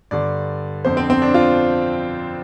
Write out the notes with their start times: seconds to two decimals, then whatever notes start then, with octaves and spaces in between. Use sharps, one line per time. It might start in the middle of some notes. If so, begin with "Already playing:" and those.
0.11 G2 D3 D5
0.85 F2 D3 C5
0.97 C4
1.10 C4
1.22 D4
1.34 F4